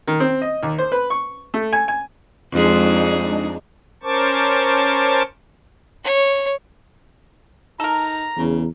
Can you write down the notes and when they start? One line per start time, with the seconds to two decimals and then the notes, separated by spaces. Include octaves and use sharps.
0.08 D#3
0.20 C4
0.42 D#5
0.63 D#2
0.78 C5
0.92 B4
1.10 C#6
1.54 A3
1.73 G#5
1.88 G#5
2.52 F2 G#3 D4 D#4 G#4
4.03 C#4 A#4 C5 A5 C#6 D6
6.04 C#5
7.80 D#4 A4 A#4 A#5
8.37 E2 C#3